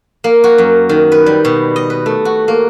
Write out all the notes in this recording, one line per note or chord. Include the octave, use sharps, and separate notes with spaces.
A#3
F#4
F#2
D#3
B4
G3
B2
D#5
B4
A3
F#4
A#3